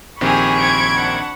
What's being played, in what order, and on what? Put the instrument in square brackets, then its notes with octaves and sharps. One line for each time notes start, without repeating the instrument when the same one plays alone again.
[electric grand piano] A#1 D#3 C4 [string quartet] G4 G#4 G#5 [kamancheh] B5 C#6
[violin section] C5 G#6 D7
[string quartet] D4 F#5